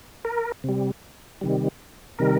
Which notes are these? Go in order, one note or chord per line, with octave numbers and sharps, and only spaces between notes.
A#4
C3 G3
C3 D#3 G3
C3 D#3 G3 A#4